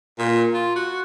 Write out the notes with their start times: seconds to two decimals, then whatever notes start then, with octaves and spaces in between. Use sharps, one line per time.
0.19 A#2
0.54 F4
0.76 F#4